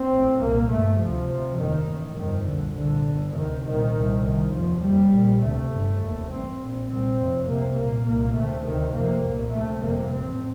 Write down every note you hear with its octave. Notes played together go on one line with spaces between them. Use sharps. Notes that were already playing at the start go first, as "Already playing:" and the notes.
Already playing: C4
A1 A2
C2 A#2 A#3
G1 G2 A3
D2 C3 F3
D2 C3
F1 D#2 D#3
A1 A2
G1 F2 C3 D#3
C2 A#2 D3
C2 A#2 D3
G1 G2
D2 C3 D#3
C2 A#2 D#3
C2 A#2
C2 C3 D#3
F1 D#2 F3
F1 D#2 G3
A#1 A#2
D2 C3 A3
G1 G2
F1 D#2
A1 G2 C4
A#1 A#2
C2 A#2 C4
F1 F2 C3
C2 C3 A#3
C2 A#2 A#3
C2 A#2 A#3
D2 C3 A3
D2 C3 D#3
F1 F2 C3 A#3
C2 A#2
D2 C3 A3
G1 F2 C3 A#3
A1 A2 C4